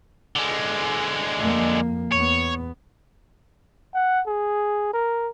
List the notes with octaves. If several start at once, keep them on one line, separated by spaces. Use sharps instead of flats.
D3 G#3
F2 A#3
E2 B3 C#5
F#5
G#4
A#4